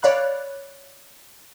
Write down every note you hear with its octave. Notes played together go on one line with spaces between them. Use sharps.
C#5 D5 F5 B5 F#6